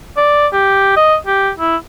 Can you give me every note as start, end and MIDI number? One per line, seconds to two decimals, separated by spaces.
0.17 0.47 74
0.53 0.93 67
0.97 1.15 75
1.27 1.50 67
1.59 1.76 64